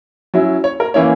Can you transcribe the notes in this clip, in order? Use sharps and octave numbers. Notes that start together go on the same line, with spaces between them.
F#3 C#4 E4
C#5
A#4
E3 A#3 C#4 E4 C#5